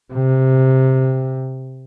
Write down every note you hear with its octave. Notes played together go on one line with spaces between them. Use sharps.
C3